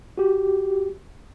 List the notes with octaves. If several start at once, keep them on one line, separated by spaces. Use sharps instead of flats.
F#4 G4